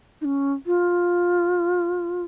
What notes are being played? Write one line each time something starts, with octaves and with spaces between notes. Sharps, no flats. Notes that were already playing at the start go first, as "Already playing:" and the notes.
D#4
C#4
F4